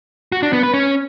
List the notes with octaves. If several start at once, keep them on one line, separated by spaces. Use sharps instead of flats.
F#4
D4
B3
B4
C#4